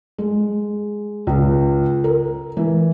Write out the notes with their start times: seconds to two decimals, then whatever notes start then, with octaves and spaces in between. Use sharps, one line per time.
0.18 G#3
1.27 C#2
2.04 A#4
2.57 E3